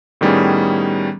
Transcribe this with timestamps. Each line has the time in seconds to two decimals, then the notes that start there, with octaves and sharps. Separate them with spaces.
0.21 A2 D#3 G3 B3 C#4 G#4